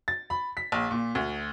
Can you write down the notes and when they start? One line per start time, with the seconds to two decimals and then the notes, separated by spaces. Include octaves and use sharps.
0.08 A6
0.30 B5
0.57 B6
0.72 A#1
0.91 A#2
1.15 D2